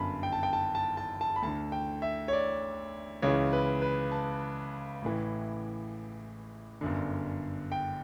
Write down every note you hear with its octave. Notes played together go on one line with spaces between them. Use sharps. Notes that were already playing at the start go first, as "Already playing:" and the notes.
Already playing: G1 F#2 D3 A5 B5
G5
A5
G5
A5
A5
A5
A5
B5
D2 D3 A5
G5
E5
C#5
D5
C#2 C#3 E3 C#5
B4
B4
A5
A1 A2 E3
G1 F#2 D3
G5